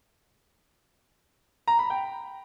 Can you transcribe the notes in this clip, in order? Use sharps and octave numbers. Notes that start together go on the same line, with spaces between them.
A#5
B5
G5